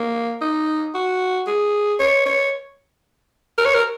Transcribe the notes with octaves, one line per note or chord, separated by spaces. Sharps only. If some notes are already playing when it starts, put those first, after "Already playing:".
Already playing: A#3
D#4
F#4
G#4
C#5
C#5
A#4
C#5
A#4